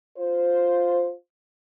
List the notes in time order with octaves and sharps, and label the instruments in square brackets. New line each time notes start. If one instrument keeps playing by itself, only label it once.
[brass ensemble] F4 C5